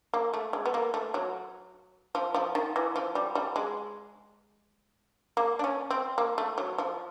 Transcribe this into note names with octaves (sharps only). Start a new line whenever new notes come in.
A#3
A3
G#3
B3
A#3
A3
F#3
F3
F3
D#3
E3
F3
G3
G3
G#3
A#3
D4
C#4
C4
A#3
A3
F#3
F3